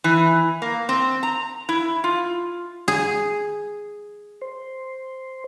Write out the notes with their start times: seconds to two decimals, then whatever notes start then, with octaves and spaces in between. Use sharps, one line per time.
0.04 E3
0.62 A#3
0.89 C4
1.23 A#5
1.69 E4
2.04 F4
2.88 G#4
4.42 C5